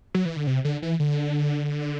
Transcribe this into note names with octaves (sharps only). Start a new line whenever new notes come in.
F#3
E3
D3
C3
D3
E3
D3